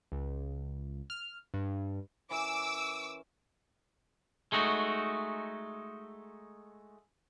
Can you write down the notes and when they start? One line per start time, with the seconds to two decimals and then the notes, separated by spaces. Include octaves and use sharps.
0.12 C#2
1.10 F6
1.54 G2
2.31 E3 C#4 A#4 D6 E6
4.52 G#3 A3 D#4 F#4